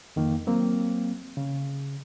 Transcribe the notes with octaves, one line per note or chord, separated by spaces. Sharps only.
F2 D#3 A#3
F#3 A#3 C4
C#3